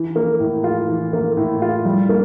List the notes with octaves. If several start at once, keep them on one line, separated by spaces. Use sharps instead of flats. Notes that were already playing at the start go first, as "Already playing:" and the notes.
Already playing: E3
A#3
A2
F4
E3
A#3
A2
F4
G3
A#3